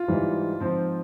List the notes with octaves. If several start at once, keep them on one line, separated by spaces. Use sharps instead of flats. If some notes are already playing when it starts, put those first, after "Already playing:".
Already playing: F4
G#2 E3 G3
G#2 F3 C4